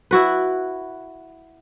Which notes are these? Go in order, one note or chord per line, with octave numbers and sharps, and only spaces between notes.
E4 F#4 B4